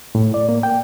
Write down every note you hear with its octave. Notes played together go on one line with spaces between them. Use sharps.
A2
D5
A#3
G5